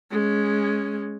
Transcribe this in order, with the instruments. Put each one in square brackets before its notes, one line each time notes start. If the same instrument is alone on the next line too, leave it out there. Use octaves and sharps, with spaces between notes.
[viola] G#3 C#4